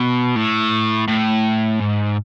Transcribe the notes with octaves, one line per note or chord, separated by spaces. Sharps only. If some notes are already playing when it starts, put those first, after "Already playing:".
Already playing: B2
A2
A2
G#2